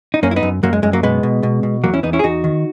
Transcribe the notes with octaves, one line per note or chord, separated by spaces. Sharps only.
D#4
F#2 A#3 C#4
E4
B3 D#4
F#2
F#2 F#3 A#3
G#3
F#2 G#3
F#3 A#3
B2 G#3 B3
B2
B2
B2
E2 F#3 A#3
C#4 E4
E2 B3 D#4
C#4 E4
G#4
E2 D#4 F#4
D#3